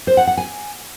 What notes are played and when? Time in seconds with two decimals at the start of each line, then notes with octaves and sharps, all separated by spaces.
0.07 C5
0.17 F#5
0.27 F#5
0.37 G#5